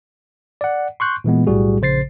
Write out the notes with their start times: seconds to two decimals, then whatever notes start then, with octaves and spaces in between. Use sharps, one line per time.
0.61 D5 F#5
1.00 C6 C#6 F#6 G6
1.24 A#2 E3 G#3 B3
1.47 B1 A2 G3 F#4 G#4
1.81 A#1 C#3 C5 A6 C7